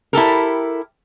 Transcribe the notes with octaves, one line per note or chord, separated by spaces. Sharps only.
E4 G4 A4 A#4